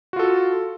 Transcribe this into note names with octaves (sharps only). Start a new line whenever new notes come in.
F4 F#4 A4